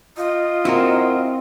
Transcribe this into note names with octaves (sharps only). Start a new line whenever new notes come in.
F4 D#5
C4 E4 F#4 A#4